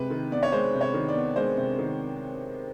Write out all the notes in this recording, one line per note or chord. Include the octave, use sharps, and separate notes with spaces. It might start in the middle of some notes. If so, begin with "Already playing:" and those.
Already playing: C3 G#3 B4
D#3
B3 D5
C#5
G#3 C5
C3
C#5
D#3
D5
B3
G#3 C5
C3
D#3